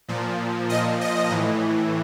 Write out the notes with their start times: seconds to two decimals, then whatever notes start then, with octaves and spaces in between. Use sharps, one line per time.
0.08 A#2 F3
0.70 A#2 F3 D#5
1.01 D#5
1.31 A2 E3